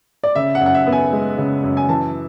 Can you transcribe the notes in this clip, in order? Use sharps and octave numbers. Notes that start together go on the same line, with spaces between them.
D5
C#3 E5
F#5
F#2
F#5
E5
B3
G#5
G#3
C#3
F#2
G#5
E3 A5